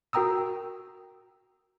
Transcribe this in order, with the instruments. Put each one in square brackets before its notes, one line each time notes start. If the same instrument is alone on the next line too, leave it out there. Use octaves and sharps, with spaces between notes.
[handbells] F#4 A#4 G5 A#5 D#6 E6